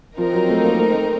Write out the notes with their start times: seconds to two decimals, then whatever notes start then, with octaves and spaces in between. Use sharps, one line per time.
0.18 F3 C4 D#4 A#4
0.33 F#3
0.49 A3
0.63 A#3
0.79 A3
0.94 A3